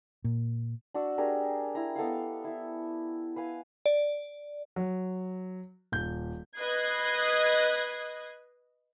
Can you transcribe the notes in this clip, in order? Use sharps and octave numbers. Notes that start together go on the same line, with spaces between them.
A#2
D4 F#4 C#6 E6
D4 G4 G#4 A#4
E4 A#5
B3 A4 D#5 F5
E4 E5
B4 F5 G#5
D5
F#3
D#1 G6
B4 D#5 D#6 F#6 G#6 C7